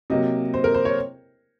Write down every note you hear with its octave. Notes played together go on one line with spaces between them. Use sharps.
C3 F#3 A#3 D#5
C5
A#4
C5
C#5